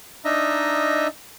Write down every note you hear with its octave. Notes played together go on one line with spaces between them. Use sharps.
D4 D#4 D#5 E5 A#5